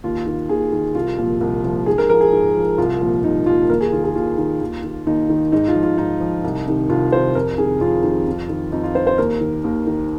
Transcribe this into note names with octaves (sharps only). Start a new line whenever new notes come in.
D#2 F4
D#3
D#2 G#4
D#3
C2 F4
A#2 F3
C2
A#2 F3
G#2 G#4
A#4
F3 A#4
G#4
G#2
F3
C2 F4
A#2 F3
C2 D#4
A#2 F3 F4
D#2 A#4
G#4
D#3 F4
G#4
D#2 F4
D#3
D#2
D#3
D#2 D#4
D#3
G#2 D#4
F4
F3
F4
G#2 D#4
F3
C2
C3 D#3
C2 F4
C3 D#3 C5
F2 A#4
C3 D#3 G#4
F2 F4
C3 D#3
F2
D#3
F2 D#4
F4
D#3 C5
C5
D#2 A#4
D#3
D#2
D#3